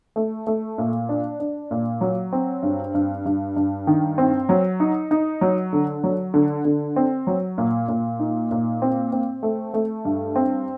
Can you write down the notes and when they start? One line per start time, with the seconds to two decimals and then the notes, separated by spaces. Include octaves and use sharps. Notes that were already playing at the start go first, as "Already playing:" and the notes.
0.16 A3
0.47 A3
0.78 A#2
1.09 D4
1.40 D4
1.71 A#2
2.01 F#3
2.33 C4
2.63 G2
2.95 G2
3.26 G2
3.56 G2
3.87 D#3
4.18 C4
4.49 F#3
4.80 D#4
5.11 D#4
5.41 F#3
5.73 D3
6.04 F#3
6.34 D3
6.65 D3
6.96 C4
7.27 F#3
7.58 A#2
7.88 A#2
8.19 D#4
8.51 A#2
8.82 C4
9.12 C4
9.43 A3
9.74 A3
10.05 G2
10.36 C4